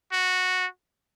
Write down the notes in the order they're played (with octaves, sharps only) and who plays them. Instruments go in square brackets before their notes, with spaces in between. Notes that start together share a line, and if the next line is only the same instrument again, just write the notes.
[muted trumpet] F#4